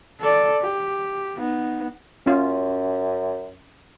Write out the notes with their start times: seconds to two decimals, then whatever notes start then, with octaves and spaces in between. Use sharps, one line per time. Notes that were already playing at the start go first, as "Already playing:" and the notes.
0.21 A4 D5
0.62 G4
1.38 B3 D#4
2.26 F#2 C#4 F4